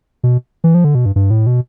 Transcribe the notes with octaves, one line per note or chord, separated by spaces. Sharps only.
B2
E3
F3
D3
B2
G2
G2
A2
B2